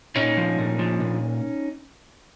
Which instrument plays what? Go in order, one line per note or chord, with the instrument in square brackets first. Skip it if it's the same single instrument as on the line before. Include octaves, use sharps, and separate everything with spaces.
[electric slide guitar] A#2 C#4 D#4
F3
A#2
F3
A#2